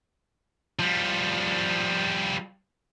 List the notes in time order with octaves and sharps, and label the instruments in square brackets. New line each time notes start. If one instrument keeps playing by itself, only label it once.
[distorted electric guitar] F3 G3